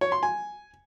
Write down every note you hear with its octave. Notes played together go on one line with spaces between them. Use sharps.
C#5
C6
G#5